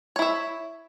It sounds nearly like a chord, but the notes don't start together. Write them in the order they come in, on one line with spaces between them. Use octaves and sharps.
C#5 E4 E5